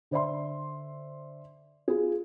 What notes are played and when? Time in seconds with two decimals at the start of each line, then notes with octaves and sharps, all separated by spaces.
0.11 D3 C5 D5 E5 C6
1.88 F4 G#4